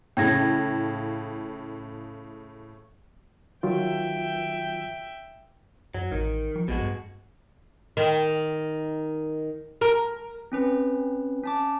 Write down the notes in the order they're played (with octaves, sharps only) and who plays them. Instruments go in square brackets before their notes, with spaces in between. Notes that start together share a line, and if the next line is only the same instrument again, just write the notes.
[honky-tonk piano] A2 C#3 [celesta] G5 G#6 A#6
[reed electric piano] D#3 F#3 F4 [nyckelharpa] E5 G5
[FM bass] F#2 [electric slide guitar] F#3
[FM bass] A1 [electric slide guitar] D#3
[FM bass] F3
[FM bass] A#1 [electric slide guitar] B2 G#3 F#4
[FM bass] G2
[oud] D#3
A#4
[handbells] C4 C#4 B4
C#4 A5 D6